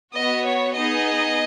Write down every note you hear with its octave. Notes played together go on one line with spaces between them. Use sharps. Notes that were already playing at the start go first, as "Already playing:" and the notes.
B3 F#4 D#5
C#5
B3 D#4 G#4 D#5